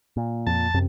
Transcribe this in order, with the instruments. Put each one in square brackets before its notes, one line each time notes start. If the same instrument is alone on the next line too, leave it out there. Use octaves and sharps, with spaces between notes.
[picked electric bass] A#2
[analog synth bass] F2 [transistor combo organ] A5
[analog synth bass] F#2 [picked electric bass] C3